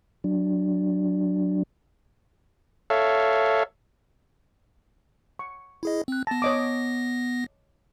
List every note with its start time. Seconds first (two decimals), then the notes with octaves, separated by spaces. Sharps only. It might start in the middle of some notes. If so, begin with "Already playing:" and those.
0.24 F#3 D4
2.90 A4 C#5 E5 F5
5.39 C#6
5.83 E4 G#4 D#5
6.08 C4 F#6
6.27 B3 A5 A#6
6.42 C#5 D#5 D6